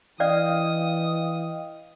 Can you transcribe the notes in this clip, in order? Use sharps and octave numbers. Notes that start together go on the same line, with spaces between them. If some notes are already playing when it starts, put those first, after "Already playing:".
E3 C#4 D5 D#5 F5 G5 D#6